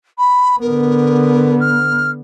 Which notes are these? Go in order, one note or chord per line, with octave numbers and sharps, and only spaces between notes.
B5
D3 B3 A#4
F6